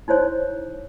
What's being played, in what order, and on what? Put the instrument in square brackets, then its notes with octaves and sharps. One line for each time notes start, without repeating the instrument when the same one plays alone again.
[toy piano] D#4 E4 C5 C#5